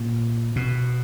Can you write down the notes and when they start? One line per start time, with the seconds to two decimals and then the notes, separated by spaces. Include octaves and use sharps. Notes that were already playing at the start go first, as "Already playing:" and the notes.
Already playing: A#2
0.56 B2